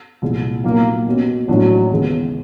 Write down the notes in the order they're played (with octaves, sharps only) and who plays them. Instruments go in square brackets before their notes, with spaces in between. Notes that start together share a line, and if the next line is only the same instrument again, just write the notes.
[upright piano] C2 A#2 F3 G#3
[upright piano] B1 A#2 F3 [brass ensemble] A#3
[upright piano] B2 G3 A#3 C#4
[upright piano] A1 A2 F3 A#3 D4 [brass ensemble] F#3
[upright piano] D#2 C#3 E3 G#3 B3